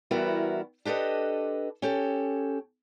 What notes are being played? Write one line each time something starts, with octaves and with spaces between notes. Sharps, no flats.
E3 G3 B3 E4 F#4 A#4
D4 G4 A4 B4 D#5
C#4 G4 A4